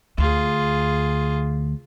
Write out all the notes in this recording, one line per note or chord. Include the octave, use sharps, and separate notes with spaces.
D2 F4 G#4